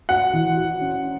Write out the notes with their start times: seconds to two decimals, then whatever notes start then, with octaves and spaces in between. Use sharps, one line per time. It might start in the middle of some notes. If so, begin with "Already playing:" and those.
0.09 F#4 F#5
0.33 E3
0.57 F#4
0.81 C#4